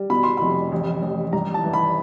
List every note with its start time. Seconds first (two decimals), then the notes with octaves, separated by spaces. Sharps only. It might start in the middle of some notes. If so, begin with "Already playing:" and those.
Already playing: G3
0.10 B2 B5
0.23 C6
0.37 F1 B5
0.72 A1
1.02 A1
1.33 G2 A#5
1.54 A5
1.64 E3
1.73 B5